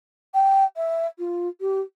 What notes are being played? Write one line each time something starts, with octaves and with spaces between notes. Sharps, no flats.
G5
E5
F4
G4